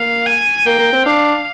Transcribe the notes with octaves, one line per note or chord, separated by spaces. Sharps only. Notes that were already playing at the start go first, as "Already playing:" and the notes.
Already playing: A#3 F5
G#5
A#3 G5
A#3
C4
D4 F5